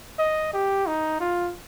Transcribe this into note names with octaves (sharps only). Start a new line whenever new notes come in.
D#5
G4
D#4
F4